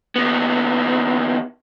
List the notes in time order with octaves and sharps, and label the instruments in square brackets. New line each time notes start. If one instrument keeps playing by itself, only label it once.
[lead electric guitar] D#2 B3